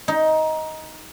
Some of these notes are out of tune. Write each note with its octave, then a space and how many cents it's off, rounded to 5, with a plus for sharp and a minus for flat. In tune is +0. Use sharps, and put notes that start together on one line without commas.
D#4 +15